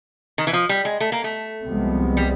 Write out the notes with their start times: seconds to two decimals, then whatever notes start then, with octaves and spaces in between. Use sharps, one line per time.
0.38 D#3
0.47 E3
0.53 F3
0.69 G3
0.85 G#3
1.00 A3
1.12 A#3
1.24 A3
1.65 C2 C3 F3 G#3 B3
2.17 G3